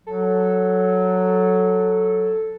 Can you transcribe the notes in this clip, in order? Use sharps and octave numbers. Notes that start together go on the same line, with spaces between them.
F#3 A4